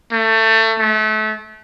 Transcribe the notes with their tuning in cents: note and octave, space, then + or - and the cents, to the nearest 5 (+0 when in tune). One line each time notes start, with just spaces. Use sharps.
A3 +25
A3 -30